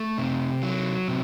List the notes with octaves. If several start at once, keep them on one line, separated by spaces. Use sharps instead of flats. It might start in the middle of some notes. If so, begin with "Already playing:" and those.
Already playing: A3
C3
F#3
C3